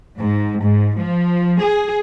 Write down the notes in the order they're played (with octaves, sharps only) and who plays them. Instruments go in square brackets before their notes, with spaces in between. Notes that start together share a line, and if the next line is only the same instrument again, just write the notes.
[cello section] G#2
G#2
F3
G#4